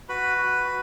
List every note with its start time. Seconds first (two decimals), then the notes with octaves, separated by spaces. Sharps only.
0.09 F#4 B4 B5
0.38 F#4
0.67 F#4